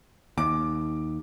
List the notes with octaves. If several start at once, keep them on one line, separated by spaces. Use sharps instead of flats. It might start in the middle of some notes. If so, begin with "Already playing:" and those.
D#2 D6